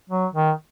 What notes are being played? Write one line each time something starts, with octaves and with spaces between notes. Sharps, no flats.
F#3
D#3